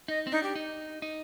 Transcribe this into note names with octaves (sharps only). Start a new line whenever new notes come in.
D#4 D#5
C4
D4 D#4
G4
D#4
D#4